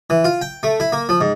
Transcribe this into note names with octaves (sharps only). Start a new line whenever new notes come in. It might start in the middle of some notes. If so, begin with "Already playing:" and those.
E3
F4
G5
A3
E4
A#3
F3
G#2